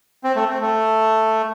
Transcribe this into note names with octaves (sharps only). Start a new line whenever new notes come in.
C4
A3
C4
A3